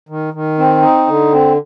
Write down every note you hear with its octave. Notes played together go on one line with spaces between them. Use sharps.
D#3
D#3
C4
D#4
D3
C4